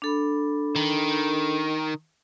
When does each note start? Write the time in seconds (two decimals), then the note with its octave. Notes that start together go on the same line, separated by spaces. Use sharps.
0.02 D4 A4 B5
0.76 D#3